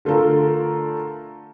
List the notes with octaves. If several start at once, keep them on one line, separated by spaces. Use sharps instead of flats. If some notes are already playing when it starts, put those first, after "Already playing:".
D3 A3 F4 A4 A#4